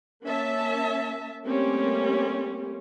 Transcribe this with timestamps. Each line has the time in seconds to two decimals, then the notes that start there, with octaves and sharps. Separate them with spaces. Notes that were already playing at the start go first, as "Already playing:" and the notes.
0.24 A#3 C#4 E5 A5
1.46 G3 A3 A#3 C4 C#4 G4